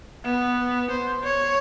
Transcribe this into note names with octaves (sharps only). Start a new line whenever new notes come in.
B3
C5
C#5